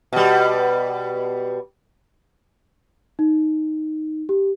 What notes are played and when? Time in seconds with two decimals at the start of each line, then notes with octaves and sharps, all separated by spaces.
0.13 B2 G3
3.19 D#4
4.29 G4